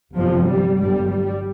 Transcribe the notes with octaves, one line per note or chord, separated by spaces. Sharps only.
G1 F2 C3 F3
G3
G1 G2 G3
G3